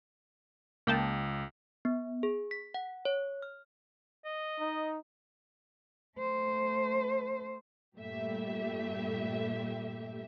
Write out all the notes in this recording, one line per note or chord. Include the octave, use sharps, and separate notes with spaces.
C#2 A#3 G5 A5
B3
G#4
B6
F#5
C#5
F6
D#5
D#4
A3 C5
G2 A#2 A3 G4 E5